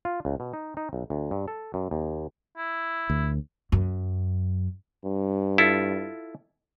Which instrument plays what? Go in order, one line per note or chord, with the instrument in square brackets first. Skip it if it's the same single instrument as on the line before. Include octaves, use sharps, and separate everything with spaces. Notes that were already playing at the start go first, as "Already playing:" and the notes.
[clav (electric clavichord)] F4
C#2
B2
D#4
D#4
B1
D2
G2
A4
F#2
D#2
[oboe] E4
[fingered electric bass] D2
[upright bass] F#2
[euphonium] G2
[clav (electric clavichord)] E4 F4 A4